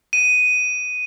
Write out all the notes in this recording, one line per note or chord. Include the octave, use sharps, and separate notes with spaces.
D#7